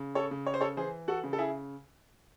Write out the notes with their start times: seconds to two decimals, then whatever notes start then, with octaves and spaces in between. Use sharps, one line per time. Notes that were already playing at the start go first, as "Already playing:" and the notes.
Already playing: C#3
0.15 A4 C#5
0.31 C#3
0.46 C#5
0.54 C5
0.61 A4 C#5
0.77 E3 G#4 C5
1.08 F#4 A4
1.24 C#3
1.33 A4
1.39 E4 G#4